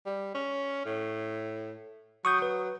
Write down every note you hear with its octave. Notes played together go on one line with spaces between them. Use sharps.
G3
C#4
A2
F#3 C#6 D#6 G6
B4